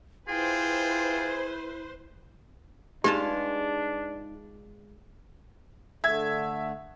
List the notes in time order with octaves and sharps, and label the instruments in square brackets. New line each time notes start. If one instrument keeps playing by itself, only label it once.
[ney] E4 [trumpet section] F4 G5 [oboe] G#4 [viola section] B4 C5
[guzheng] G#3 F4 A5 [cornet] D4 [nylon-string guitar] D#4 G#4 B4 [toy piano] G4
[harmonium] D3 A3 [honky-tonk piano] E5 G#6